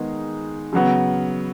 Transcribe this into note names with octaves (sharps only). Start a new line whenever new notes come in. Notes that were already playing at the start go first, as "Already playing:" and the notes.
Already playing: D#3 G#3 B3 D#4 G#4
C#3 F#3 B3